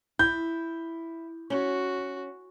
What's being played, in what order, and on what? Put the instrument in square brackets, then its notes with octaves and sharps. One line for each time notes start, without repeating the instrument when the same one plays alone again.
[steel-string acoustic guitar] E4 [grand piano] G6
[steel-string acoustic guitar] C#4 [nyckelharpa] F#4